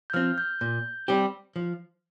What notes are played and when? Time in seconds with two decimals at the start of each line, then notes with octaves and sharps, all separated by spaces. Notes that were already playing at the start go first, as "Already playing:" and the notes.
0.10 G6
0.13 F3 C4 F6
0.38 G6
0.61 A#2 G6
1.08 G3 C4 G4
1.56 F3